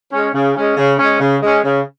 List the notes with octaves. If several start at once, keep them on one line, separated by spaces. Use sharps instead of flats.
G#3 C#4
C#3
G#3 C#4
C#3
G#3 C#4
C#3
G#3 C#4
C#3